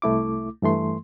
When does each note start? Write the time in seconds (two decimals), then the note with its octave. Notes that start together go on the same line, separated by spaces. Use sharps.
0.02 C2 A3 E4 D6
0.62 G2 E3 A3 C6